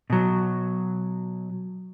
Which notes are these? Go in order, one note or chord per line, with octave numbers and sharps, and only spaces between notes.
B2 F#3